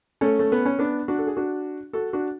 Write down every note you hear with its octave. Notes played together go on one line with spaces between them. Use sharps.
A3 C#4
A3
B3
C#4
B3 D4
D4 F#4
A4
G#4
D4 F#4
F#4 A4
D4 F#4